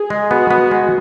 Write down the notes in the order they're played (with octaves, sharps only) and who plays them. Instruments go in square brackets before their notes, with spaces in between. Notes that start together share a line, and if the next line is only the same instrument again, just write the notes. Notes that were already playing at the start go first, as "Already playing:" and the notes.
Already playing: [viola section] G#4
[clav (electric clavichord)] G#3
[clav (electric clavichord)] B3 [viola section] F#4
[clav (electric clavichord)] B3
G#3